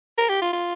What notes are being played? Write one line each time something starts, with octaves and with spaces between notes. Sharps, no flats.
A#4
G4
F4
F4